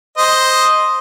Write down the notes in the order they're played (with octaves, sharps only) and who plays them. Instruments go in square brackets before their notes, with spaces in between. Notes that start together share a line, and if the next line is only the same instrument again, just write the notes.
[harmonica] C5 D#5